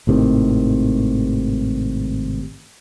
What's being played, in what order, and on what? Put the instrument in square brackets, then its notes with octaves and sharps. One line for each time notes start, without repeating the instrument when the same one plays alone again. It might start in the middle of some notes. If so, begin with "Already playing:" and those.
[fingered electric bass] G#1 A2 C3 D#3